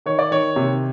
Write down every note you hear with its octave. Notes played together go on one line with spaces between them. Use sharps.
D#3 C#5
D5
D#3 C#5
C3